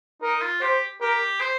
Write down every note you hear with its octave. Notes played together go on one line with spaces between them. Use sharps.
D#4 A#4
F4
G4 C5
G4 A#4
C5